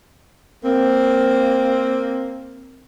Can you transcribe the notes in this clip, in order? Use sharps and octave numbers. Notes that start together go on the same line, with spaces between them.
A#3 C4